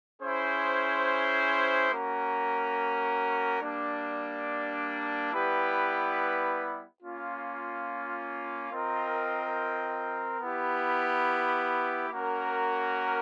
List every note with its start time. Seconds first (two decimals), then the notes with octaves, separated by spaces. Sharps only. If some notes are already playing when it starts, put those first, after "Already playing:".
0.22 C#4 E4 G#4 C5
1.91 A#3 C#4 F#4 A#4
3.61 G3 A#3 D4
5.31 G3 B3 E4 G4 B4
7.01 A#3 C#4 F4
8.71 C4 F4 A#4 D#5 G5
10.40 B3 E4 G4
12.09 A#3 C#4 F#4 A#4